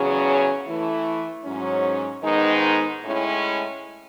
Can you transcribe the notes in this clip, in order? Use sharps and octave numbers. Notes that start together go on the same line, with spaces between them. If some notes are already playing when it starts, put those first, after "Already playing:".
Already playing: E2 C#3 F#3 C#4 G#4
E3 A3 E4
G#2 F#3 C#4
G#2 D#3 G#3 B3 D#4
A2 G#3 C#4 E4